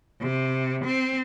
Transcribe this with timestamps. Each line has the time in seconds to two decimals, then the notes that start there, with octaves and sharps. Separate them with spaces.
0.21 C3
0.84 C4